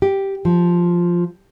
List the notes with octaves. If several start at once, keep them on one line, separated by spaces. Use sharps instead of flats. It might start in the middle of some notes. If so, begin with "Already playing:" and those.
G4
F3